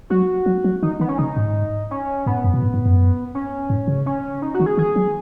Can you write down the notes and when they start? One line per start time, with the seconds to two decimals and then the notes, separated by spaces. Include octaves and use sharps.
0.10 F#3 F#4
0.46 F#3
0.64 F#3
0.83 D#3 D#4
1.00 D#3 B3
1.09 C#4
1.18 C#3 D#4
1.37 G#2
1.91 C#4
2.26 G#2 B3
2.44 F#2
2.54 B2
2.62 G#2
2.74 G#2
2.86 F#2
3.35 C#4
3.70 G#2
3.88 C#3
4.06 C#4
4.42 D#4
4.54 F#4
4.60 D#3
4.66 G#4
4.77 D#3 G#4
4.96 F#3